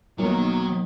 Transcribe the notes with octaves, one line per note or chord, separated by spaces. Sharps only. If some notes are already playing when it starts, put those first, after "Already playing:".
B1 D#3 F#3 A#3 B3